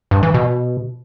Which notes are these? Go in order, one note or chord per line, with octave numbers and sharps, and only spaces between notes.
G2
E3
B2